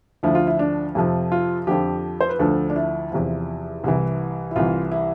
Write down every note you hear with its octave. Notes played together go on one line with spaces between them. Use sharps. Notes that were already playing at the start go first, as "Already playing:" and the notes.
D2 D3 F3 E4
F4
E4
D4
F2 C3 F3
F4
F2 D3 F3 G4
C5
B4
D2 D3 F3 A4
D4
E4
E2 C3 F3
C2 C3 E3
E4
C2 C3 E3 F4
E4